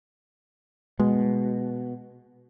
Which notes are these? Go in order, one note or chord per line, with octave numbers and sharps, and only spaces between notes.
B2 G#3